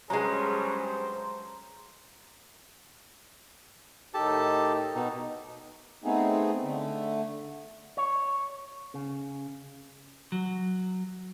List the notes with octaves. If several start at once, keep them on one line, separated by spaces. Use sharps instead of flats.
G2 F#3 G#3 C#4 G#4 C5 A#5
A2 D#3 D#4 G4 A4 A5
B2 D#4
A3 B3 C4 D#4 G#4
D3 A3
C#5
C#3
F#3